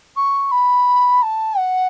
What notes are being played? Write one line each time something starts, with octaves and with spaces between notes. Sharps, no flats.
C#6
B5
A5
F#5